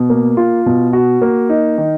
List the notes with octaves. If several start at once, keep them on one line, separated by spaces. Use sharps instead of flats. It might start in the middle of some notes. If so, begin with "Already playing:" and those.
Already playing: B2
A#3
F4
B2
F#4
A#3
D#4
D#3